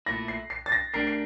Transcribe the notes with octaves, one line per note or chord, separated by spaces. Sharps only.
A#2 A3 E4 A#6
C7
C7
A6
A#6
A3 D4 G4 A#4 C7
C7